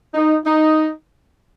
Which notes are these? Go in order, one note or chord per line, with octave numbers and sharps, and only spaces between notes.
D#4
D#4